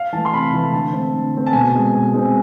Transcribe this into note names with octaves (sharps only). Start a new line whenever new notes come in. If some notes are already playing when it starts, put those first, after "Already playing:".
Already playing: F5
E3 A3 A5
C6
C3 B5
E3 A3 B5
D3 A5
A3 C4
D3
A3 C4
A5
B2 G#5
G#3 C4
B2
G#3 C4